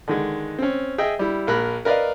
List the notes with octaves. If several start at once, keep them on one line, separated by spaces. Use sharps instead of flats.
D3 D#3 G#3
C4 C#4
G#4 D#5 E5 G5
G3 E4
A#1 A#4 B5 F#6
A#4 B4 D5 D#5 F5